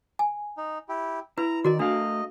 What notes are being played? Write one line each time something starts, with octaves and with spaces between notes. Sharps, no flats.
G#5
D#4
E4 G4
E4 B4 A#5
D#3 F#4 A#4 D5 D#5
A3 D4 D#5 F5